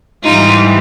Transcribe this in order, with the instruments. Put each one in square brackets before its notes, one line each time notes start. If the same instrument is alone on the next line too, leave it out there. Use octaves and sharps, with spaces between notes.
[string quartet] G#2 E3 G3 D#4 F4